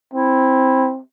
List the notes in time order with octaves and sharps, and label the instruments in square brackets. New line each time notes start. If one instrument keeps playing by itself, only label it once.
[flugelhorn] C4 [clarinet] E4